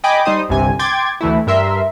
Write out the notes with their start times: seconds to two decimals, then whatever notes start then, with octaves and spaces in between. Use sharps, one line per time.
0.04 D#5 G5 G#5 B5 D6
0.25 G3 D#4 C5 D#6
0.49 G1 C2 G2 C3 G#5
0.79 G5 C6 D6 G#6 A6
1.21 D2 E3 A3 E4
1.47 G2 A#4 E5 C6